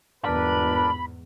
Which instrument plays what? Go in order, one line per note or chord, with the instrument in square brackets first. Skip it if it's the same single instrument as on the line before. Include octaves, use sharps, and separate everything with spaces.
[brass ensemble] G1 B4 [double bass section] E2 G#2 [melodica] D4 A#4 D5 [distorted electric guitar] B5